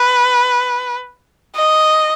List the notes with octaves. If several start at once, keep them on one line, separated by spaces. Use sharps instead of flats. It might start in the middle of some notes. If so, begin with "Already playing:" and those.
Already playing: B4
D#5